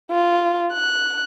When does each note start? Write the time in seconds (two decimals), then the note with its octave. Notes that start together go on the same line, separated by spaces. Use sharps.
0.11 F4
0.73 F#6